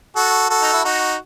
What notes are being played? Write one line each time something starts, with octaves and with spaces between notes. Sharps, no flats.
F#4 A4
F#4 A4
D#4
E4
D#4 F#4